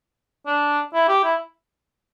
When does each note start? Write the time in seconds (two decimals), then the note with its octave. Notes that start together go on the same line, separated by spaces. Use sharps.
0.47 D4
0.94 E4
1.09 G4
1.24 E4